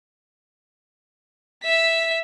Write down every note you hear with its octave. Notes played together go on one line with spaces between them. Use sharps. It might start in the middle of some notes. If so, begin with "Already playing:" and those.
E5 B6